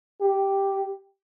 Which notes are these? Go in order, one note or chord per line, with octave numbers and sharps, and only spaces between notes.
G4